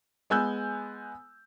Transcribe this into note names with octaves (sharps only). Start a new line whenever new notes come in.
G#3 B3 G#5 E6 F#6 G6